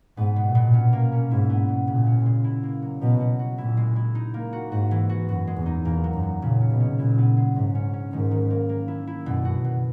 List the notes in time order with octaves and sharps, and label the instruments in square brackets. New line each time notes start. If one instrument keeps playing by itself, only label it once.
[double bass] G#2 [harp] B3
[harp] B2
[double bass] A#2
[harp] B2
C#4
A#3
C#4
[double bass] G#2 [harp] E4
[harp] B3
B2
[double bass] A#2 [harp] C#3
[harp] C#4
G#3
E4
A#3
F#3
[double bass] B2 [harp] F#3
[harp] F#4
F#4
[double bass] A#2 [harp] E4
[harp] G#3
E4
D#4
A#3
F#4
[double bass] G#2 [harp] F#4
[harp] E3
F#4
[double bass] F#2 [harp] F#4
[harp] G#3
[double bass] E2
[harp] D#4
[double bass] E2 [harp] A#3
[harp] F#3
[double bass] F#2
[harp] F#3
[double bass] A#2 [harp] C#3
[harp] C#4
[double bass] B2
[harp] C#4
[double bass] A#2 [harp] E4
[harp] B3
G#3
[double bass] G#2 [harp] F#3
[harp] C#4
C#4
[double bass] G#2 [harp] D#3
[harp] D#3
A#3
A#3
E4
E4
[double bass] F#2 [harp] B2
[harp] F#4
B2